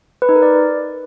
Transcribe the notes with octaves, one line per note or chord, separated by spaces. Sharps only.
B4
D#4
A#4
D5